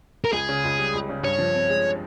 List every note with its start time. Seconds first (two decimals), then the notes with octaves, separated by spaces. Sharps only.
0.25 A#4
0.33 C#2 G#4
0.49 C#3
0.64 C#2
0.79 G3
0.93 C#2
1.09 C#3
1.23 G2 C#5
1.38 F3
1.55 C4
1.69 G#3